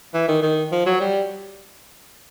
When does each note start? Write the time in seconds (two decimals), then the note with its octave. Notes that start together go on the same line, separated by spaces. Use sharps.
0.14 E3
0.28 D#3
0.42 D#3
0.72 F3
0.86 F#3
1.01 G3